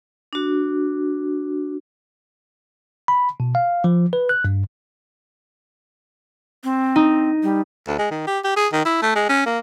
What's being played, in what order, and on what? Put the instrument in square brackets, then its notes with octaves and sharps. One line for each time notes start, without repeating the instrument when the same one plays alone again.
[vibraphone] D4 F#4
[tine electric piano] B5
B2
F5
F3
B4
F#6
G2
[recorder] C4
[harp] D#4
[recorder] G3
[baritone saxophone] D2
G#3
D#3
G4
G4
G#4
D#3
E4
A3
G#3
C#4
A#3